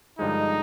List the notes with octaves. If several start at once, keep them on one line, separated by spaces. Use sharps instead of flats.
G2 D3 F3 G#3 D#4